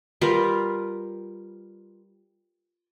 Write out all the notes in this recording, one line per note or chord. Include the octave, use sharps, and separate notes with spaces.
G3 F4 A#4 B4